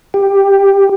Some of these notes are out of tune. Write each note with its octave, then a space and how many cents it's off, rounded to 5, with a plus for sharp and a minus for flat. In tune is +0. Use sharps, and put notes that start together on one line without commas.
G4 +10